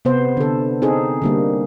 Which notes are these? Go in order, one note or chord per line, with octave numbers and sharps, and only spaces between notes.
C3 B3 C5
D3 A4
C4 D#4 G#4 A4
D3 G3 A#3